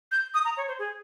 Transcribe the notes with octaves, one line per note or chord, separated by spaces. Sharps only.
G6
D#6
A#5
C#5
C5
G#4